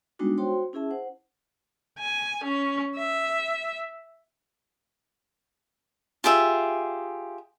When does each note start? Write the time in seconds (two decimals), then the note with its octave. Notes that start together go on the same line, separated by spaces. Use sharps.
0.19 G3 G#3 B3 D4 D#4 F#4
0.38 F#4 C5 C#5 G5 C6
0.73 C#4 E4 G#4 E5 A5
0.90 C5 F#5
1.99 G#5
2.44 C#4
2.96 E5
6.24 F4 G4 G#4 E5